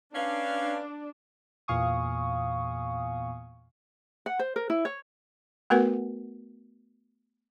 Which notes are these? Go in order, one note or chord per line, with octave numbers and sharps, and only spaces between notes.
C#4 D4 B4 F5
E2 A#2 F5 G#5 C#6 D#6
F#5
C5
A#4
E4
C#5
A3 B3 F#4 A#4 B4 F#5